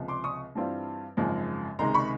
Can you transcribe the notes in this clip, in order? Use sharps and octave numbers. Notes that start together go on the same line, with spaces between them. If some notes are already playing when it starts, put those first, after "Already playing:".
Already playing: C#2 C3 F3
C6 D6
C#6 D#6
G2 E3 G3 C4 F4
G#1 F#2 C#3 F3 G#3
C#2 C3 D#3 G#3 A#5 C6
B5 C#6